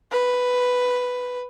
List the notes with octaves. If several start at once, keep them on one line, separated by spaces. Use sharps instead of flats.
B4